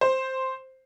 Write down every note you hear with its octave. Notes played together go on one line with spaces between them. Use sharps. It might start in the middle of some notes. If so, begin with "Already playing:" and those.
C5